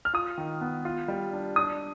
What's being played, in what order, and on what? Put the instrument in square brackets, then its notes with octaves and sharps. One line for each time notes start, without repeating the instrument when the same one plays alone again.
[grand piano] F6
F4 D#6
D#3
B3
F4
G3
D4
D4 D#6